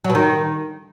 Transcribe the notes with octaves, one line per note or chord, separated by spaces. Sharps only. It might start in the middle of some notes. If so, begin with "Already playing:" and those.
F#3
B2
D#3